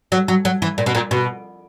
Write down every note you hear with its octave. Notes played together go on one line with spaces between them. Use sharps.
F#3
F#3
F#3
E3
A#2
B2
A#2
B2